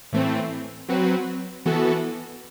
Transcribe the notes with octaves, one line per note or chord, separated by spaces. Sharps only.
A2 E3 A3 C4
F#3 C4 F#4 B4
E3 B3 F#4 A4